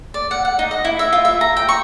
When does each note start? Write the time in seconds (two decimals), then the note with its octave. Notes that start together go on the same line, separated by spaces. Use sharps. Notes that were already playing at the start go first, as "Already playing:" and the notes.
0.14 D5
0.31 F#5
0.45 F#5
0.59 D#4
0.71 D#5
0.85 E4
0.99 E5
1.13 F4
1.25 E5
1.41 A#5
1.57 G5
1.69 C#6